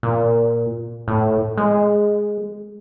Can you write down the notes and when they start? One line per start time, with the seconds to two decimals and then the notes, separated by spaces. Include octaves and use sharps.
0.03 A#2
1.08 A2
1.57 G#3